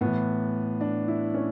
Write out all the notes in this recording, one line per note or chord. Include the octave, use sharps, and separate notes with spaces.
A2 E3 B3
D4
E4
C#4